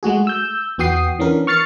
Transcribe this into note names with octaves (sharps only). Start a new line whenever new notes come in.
G#3 A3 F#4 G#4
E6 G6
E2 B3 F#4 G5 D#6 C7
E3 B3 C#4 D4 A#4
C#6 F6 A6 C7 C#7